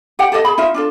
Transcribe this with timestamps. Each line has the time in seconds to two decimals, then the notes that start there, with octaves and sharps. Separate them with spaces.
0.19 G4 F#5 G5
0.32 G4 A4 D5 D#5
0.45 G#4 B5
0.58 D#4 F4 E5
0.74 D4 F4 A4